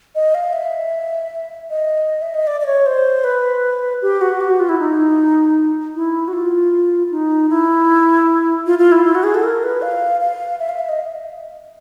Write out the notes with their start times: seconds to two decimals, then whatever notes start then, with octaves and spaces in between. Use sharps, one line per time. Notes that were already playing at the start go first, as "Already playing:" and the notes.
0.15 D#5
0.35 F5
0.53 E5
1.70 D#5
2.22 E5
2.34 D#5
2.47 D5
2.61 D5
2.66 C#5
2.86 C5
3.24 B4
4.02 G4
4.21 F#4
4.40 G4
4.50 F#4
4.60 F4
4.69 E4
4.79 D#4
5.95 E4
6.28 F#4
6.33 F4
7.11 D#4
7.50 E4
8.67 F4
8.79 F4
8.92 E4
9.05 E4
9.15 F#4
9.24 G#4
9.34 A4
9.44 A#4
9.63 B4
9.82 F5
10.21 F5
10.59 E5
10.69 F5
10.79 E5
10.89 D#5